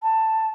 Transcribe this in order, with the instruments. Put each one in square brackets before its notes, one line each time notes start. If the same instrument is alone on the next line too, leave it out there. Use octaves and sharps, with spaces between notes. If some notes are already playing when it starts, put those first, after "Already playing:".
[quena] A5